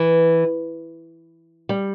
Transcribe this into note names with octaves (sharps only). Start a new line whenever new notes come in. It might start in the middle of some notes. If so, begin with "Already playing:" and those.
Already playing: E3
G3